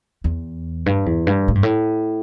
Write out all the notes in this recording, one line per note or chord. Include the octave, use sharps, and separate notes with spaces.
E2
G2
E2
G2
A2
G2
A2